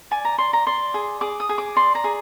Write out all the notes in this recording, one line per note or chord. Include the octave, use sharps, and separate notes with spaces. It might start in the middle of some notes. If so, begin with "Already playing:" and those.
D5 G#5
A#5
D5 C6
A#5
D5 C6
G#4
G#4 D6
D#6
G#4
D6
D5 C6
A#5
G#4